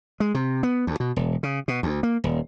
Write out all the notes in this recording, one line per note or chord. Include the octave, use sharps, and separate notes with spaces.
G#3
C3
B3
D2
B2
E1
C#3
B2
D2
A#3
D#1